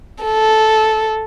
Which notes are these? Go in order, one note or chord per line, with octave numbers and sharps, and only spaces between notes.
A4